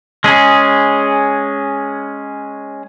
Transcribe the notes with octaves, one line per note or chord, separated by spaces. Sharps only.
G#3 C#4 G#4